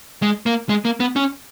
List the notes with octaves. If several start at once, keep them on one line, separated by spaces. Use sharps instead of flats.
G#3
A#3
G#3
A#3
B3
C#4